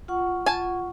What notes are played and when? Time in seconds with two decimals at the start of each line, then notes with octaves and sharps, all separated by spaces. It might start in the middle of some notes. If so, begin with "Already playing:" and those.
0.08 F4 F#5 C#6
0.46 G#5 A5